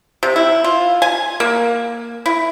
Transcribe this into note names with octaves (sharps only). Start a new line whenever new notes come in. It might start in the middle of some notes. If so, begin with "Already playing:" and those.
C3
E4
F4
G#5
A#3
E4